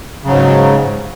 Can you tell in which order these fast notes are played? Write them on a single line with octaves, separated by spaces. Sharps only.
C#3 F#3 G#2